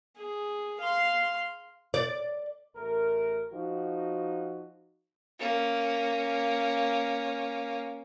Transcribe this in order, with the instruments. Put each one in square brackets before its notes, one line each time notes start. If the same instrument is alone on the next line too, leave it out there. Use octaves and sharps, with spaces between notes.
[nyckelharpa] G#4
F5 C6
[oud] D5
[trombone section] A1 A3 A#4
F3 D#4 F#4
[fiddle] A#3 C#4